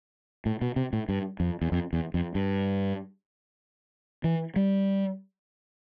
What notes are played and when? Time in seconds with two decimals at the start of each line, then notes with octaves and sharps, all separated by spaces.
0.46 A2
0.61 B2
0.76 C3
0.93 A2
1.09 G2
1.40 F2
1.62 E2
1.72 F2
1.93 E2
2.14 F2
2.35 G2
4.24 E3
4.56 G3